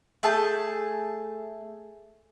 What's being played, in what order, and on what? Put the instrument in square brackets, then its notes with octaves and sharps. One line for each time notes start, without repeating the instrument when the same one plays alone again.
[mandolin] A3 G#4 A5 G6